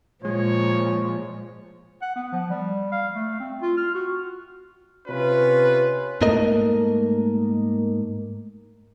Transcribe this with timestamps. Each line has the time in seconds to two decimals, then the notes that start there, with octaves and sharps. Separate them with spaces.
0.25 A#2 F3 G#3 C#5
2.02 F#5
2.16 B3
2.32 F3
2.50 G3
2.92 F5
3.15 A3
3.40 C4
3.62 F4
3.77 F6
3.95 F#4
5.08 C3 C#4 F4 B4
6.22 G#2 A3 A#3 A#4 D#5